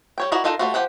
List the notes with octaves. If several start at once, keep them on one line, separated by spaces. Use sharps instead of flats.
G3 C#5 G5
E4 F#4 A#4 D5 D#5
D4 D#4 F4 A4 A#4
G3 A3 B3 F4 F#4
F3 G4 F#5 G5